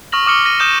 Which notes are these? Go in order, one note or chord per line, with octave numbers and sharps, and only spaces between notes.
C#6 D#6 F6 A#6 F#7
D6 D#6 F6 C#7 G7
A#6 D#7
D#6 G6 E7